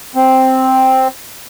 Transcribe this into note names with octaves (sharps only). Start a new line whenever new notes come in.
C4